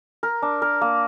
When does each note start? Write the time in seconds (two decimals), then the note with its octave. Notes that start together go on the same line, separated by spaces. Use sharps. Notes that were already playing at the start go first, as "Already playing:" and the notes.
0.23 A#4
0.42 D4
0.62 A#4
0.81 A#3